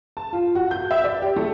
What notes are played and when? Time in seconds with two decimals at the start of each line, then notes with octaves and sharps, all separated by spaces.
0.17 A5
0.33 F4
0.55 F#4
0.71 G6
0.91 E5
1.04 D5
1.22 G4
1.36 A3